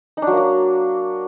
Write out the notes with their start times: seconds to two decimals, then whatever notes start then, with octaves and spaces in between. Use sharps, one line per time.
0.17 D#4
0.22 D4
0.27 F#3
0.32 A#3
0.37 F#3